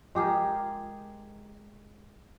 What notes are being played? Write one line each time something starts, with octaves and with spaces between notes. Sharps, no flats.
G#3 G4 G#4 A#4